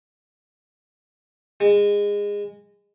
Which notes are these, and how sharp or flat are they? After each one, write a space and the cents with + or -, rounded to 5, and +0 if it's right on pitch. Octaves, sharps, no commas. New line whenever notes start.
G#3 -20